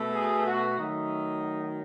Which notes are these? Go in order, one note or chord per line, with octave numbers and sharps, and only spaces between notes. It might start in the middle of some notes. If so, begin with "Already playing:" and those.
Already playing: B2 A3
G#4
F#4
D#3 F#3 A3 D#4